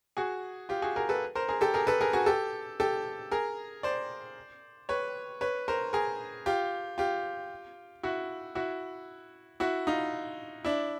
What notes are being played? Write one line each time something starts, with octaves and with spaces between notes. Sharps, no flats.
F#4 G#4
F4 G4
F#4 G#4
G#4 A#4
A4 B4
A#4 C5
G#4 A#4
G4 A4
G#4 A#4
A4 B4
G#4 A#4
F#4 G#4
G4 A4
G4 A4
G#4 A#4
C5 D5
B4 C#5
B4 C#5
A#4 C5
G#4 A#4
F4 G4
F4 G4
E4 F#4
E4 F#4
E4 F#4
D#4 F4
D4 E4